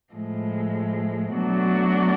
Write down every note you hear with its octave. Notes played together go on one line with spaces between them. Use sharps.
A2 F3 G#3
B2 F#3 A3 D4 F#4